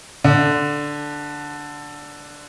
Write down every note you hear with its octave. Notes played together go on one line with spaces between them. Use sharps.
D3